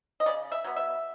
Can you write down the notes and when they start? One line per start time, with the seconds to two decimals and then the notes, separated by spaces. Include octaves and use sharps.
0.20 D#5
0.26 C#3 D5
0.52 E5
0.64 F#3 B3
0.76 E5